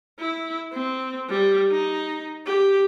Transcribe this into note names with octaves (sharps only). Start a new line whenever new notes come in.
E4
C4
G3
D#4
G4